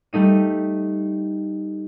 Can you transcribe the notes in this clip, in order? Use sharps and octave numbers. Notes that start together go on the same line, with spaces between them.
G3 A3 D#4 D#7